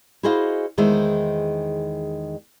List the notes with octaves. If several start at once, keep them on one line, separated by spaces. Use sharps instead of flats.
E4 F#4 G#4 C5 D#5 F5
E2 D#3 G#3 C5 E5